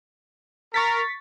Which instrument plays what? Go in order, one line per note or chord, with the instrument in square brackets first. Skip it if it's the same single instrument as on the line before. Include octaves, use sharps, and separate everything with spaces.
[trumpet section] A#4 [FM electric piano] C#6 A6 B6